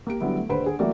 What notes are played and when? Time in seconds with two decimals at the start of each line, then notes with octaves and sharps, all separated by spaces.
0.07 A#3 G4 D7
0.20 D3 F#3 G3 B3 E4
0.37 A3
0.49 D#1 D3 B4 C5 B5 D7
0.64 D3 G#4
0.79 E3 F#3 A3 A#3 F#4 D5